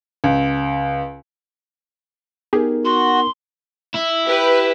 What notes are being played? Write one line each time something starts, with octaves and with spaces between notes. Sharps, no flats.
C#2
B3 D#4 G4 G#4 A#4
F#4 C6
E4
G4 B4